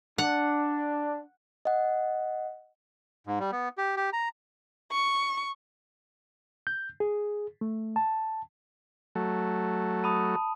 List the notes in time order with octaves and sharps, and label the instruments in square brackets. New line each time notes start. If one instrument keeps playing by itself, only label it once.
[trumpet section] D4 [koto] F#5
[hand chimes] D#5 F#5
[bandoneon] G#2
G3
B3
G4
G4
A#5
[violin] C#6
[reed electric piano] G6
G#4
A3
A5
[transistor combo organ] F#3 A3
[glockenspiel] A5 B5 D#6